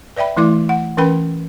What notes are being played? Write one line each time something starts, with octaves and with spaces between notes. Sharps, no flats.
B4 D5 E5 G5 B5
E3 A3 E4 D5 D6
F#5
E3 C#4 A#4 B4 G5 B5